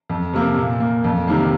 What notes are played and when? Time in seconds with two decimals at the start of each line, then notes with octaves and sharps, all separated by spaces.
0.09 F2
0.33 C3 F3 A#3
0.56 A#2
0.80 A#3
1.04 F2
1.27 C3 D#3 G3 A#3